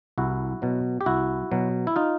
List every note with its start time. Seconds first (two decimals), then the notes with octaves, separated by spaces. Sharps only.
0.18 C2 E4 F#4
0.62 B2 F#3
1.01 G4
1.06 C2 E4 F#4
1.51 B2 F#3
1.87 E4
1.96 D#4 F4